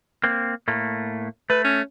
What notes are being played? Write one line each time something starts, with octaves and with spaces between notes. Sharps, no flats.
A#3 C4
A2 A3 A#3
A3 B4
C#4